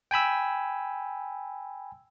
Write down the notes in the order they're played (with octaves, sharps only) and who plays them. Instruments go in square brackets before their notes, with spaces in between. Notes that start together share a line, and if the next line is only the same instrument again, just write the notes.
[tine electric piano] G5 G#5 B5 E6